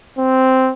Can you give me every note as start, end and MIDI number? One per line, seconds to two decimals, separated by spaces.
0.19 0.72 60